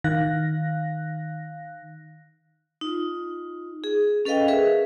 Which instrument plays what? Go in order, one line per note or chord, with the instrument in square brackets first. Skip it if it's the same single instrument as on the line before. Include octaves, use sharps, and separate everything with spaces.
[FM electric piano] D#3 F5 F#6 A#6
[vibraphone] D#4 F4
G#4
C#4 A4 B4 D#5 F5 G5
G#4 A#4 B4 E5